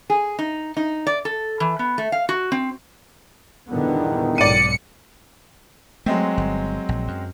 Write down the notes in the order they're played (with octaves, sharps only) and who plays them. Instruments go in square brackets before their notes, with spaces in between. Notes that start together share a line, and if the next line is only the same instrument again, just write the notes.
[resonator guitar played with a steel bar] G#4
D#4
D#4
D5
A4
E3
B3
A3
F5
F#4
C4
[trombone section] E2 G2 D#3 [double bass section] A#2 D3 B3
[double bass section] B1 G#2 [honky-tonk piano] D5 D#7 [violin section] C#7
[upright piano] F#3 G#3 C4 [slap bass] A3
[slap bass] G1
A#1
F#2